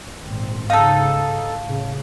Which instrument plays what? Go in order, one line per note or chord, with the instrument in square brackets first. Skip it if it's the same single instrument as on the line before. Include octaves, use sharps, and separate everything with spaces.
[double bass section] G#1 A#2 C4
[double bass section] G#2 C#3 [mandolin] D#4 A4 [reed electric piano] F5 A5
[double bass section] A2 C#3